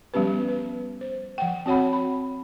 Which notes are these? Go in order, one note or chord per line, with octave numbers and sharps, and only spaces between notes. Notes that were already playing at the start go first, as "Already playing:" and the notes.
F3 G3 B3 C#4 G4 B4
B4
C5
F3 F#5 G5
C4 F#4 C#5 F#5 B5
B5